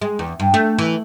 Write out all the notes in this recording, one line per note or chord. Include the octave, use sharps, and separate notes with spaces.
G#3
E2
G2
A3
E3